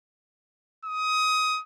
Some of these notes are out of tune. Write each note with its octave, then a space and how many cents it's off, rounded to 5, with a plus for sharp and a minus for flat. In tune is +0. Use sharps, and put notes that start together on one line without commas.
D#6 +20